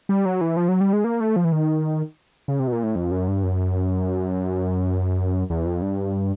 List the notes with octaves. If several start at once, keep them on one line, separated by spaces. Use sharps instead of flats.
G3
F#3
E3
F3
F#3
G3
G#3
A#3
A3
F3
E3
D#3
C#3
C3
B2
A#2
A2
F2
F#2
G2
F#2
E2
F2
G2